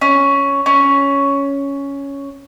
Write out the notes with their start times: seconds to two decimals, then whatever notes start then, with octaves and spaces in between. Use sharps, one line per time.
0.01 C#4
0.66 C#4